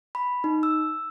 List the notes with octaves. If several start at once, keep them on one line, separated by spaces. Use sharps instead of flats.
B5
D#4
E6